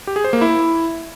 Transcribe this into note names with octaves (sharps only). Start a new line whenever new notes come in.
G4
G#4
C5
A#3
E4